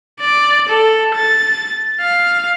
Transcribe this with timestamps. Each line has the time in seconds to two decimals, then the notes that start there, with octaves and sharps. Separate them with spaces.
0.20 D5
0.69 A4
1.15 A6
2.01 F5